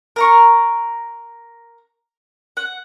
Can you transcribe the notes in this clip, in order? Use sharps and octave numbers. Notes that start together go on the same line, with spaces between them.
A#4 A#5 C#6
F#5